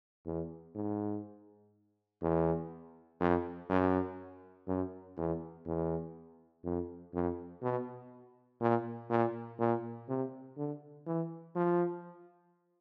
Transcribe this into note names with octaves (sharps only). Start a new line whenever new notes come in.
E2
G#2
E2
F2
F#2
F#2
E2
E2
F2
F2
B2
A#2
A#2
A#2
C3
D3
E3
F3